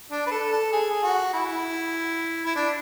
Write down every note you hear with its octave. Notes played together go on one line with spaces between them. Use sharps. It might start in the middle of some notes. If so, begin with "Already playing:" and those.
D4
B4
A4
A4
G#4
F#4
E4
E4
D4